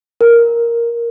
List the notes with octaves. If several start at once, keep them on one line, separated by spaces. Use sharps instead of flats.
A#4